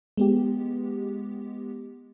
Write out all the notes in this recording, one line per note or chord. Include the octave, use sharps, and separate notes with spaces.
G#3 B3 G4